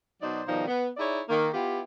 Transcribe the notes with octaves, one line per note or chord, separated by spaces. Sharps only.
B2 F#3 D#4 C5 D5
B2 D#3 F3 G3 D#4
B3
D#4 E4 G#4 C#5 D5 E5
D#3 A#3
B3 E4 F4 G4